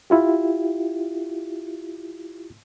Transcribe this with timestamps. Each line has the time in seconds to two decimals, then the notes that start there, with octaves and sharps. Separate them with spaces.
0.10 E4 F4 G4